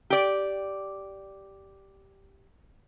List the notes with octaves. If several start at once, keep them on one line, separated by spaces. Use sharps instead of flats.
G4 D5